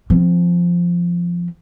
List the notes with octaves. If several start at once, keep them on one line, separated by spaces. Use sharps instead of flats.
F3 C4